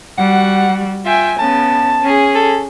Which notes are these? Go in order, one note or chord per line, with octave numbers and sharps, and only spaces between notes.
G3 F#4 F#5
F4 E5 G5 G#5
C#3 B3 A5
C#4 G#4
A4